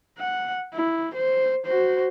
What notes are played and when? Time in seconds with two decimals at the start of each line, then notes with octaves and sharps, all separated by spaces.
0.18 F#5
0.74 E4
1.15 C5
1.66 F#4 C5